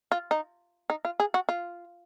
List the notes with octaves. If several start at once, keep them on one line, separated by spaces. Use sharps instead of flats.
F4
D#4
D#4
F4
G#4
F#4
F4